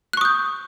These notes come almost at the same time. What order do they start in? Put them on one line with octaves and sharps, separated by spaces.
F#6 C#6 D#6 G6